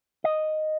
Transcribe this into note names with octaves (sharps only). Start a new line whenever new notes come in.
D#5